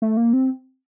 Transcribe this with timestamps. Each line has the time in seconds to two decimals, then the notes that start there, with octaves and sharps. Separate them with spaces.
0.02 A3
0.17 A#3
0.33 C4